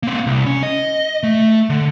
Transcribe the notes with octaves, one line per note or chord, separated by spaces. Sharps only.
A#3 C4
C2
C#4
D#5
A3
D3